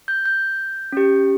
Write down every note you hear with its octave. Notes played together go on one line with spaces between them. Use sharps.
G6
G6
C#4 G4